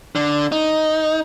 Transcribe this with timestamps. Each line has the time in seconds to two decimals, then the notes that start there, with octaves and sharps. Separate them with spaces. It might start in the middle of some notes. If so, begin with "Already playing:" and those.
0.15 D3
0.52 D#4